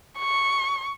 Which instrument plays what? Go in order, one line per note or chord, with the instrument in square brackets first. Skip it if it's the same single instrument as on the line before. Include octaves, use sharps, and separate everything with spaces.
[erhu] C#6